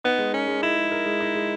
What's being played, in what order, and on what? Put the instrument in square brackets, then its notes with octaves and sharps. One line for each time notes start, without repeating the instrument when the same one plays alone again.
[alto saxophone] B3 [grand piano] D#4
[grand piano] G#3
[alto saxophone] C#4 [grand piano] A#4
[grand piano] G#3
[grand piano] D#4 [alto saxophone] E4
[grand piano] G#3
A#4
G#3
D#4
G#3